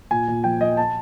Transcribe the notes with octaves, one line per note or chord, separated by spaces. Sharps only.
A#2 G#5
A#2
F3 G5
F3 D#5
A5